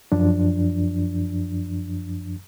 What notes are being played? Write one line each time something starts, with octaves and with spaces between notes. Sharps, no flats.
F#2 F3 D4